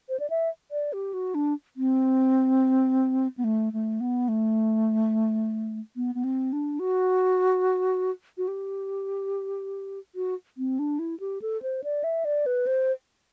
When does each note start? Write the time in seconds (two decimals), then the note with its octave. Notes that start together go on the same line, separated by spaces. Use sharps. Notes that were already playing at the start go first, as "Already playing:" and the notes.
0.09 C5
0.20 D5
0.30 E5
0.71 D5
0.93 G4
1.14 F#4
1.35 D4
1.77 C4
3.38 B3
3.44 A3
3.73 A3
4.00 B3
4.28 A3
5.96 B3
6.15 B3
6.24 C4
6.53 D4
6.79 F#4
8.38 F#4
8.48 G4
10.15 F#4
10.58 C4
10.79 D4
10.99 E4
11.20 G4
11.42 A4
11.62 C5
11.84 D5
12.04 E5
12.25 D5
12.46 B4
12.67 C5